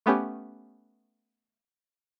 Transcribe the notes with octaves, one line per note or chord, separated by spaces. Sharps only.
A3 B3 C#4 G4